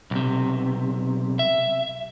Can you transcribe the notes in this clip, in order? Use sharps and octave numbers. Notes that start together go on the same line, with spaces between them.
B1 C3
E5